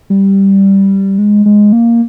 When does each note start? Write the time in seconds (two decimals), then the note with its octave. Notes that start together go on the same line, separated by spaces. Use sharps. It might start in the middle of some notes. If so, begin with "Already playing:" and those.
0.10 G3
1.18 G#3
1.46 G#3
1.73 A#3